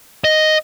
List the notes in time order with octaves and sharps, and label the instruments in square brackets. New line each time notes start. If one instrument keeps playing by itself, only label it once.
[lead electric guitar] D#5